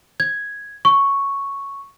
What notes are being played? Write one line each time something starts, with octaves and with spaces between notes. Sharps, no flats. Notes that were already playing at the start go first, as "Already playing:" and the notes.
G#6
C#6